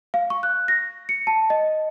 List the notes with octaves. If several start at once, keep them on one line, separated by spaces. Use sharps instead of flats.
F5
C#6
F#6
A#6
C#7
A5
D#5